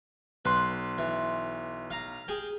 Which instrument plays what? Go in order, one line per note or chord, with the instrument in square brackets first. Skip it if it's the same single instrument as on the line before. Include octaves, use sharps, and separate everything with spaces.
[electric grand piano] B1 C6 [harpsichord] B4
[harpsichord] E3
F5 A#5
G4 G#4